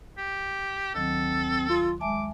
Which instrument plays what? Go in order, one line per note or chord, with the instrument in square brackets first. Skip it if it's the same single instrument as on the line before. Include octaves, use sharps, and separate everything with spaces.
[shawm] G4
[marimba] D2 D#3 F#3 [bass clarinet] C4 [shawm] A4
[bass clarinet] F4 [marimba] C6
[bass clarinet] G#3 [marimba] E5 G#5 A5 [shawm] D6